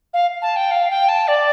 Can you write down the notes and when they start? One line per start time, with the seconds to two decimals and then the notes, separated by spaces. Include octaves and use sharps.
0.14 F5
0.42 A5
0.56 G5
0.71 F5
0.90 G5
1.09 A5
1.28 D5